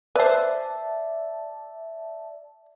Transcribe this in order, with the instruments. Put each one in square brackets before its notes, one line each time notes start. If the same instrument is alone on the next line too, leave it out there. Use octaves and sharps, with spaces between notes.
[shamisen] B4 C5 [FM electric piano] D5 E5 A5